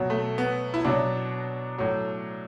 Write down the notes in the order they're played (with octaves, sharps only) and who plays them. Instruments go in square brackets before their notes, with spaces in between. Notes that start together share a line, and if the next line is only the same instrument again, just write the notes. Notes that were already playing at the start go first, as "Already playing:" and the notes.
Already playing: [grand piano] B2 F#3
A3
B3
E4
B2 F#3 D4
A2 F#3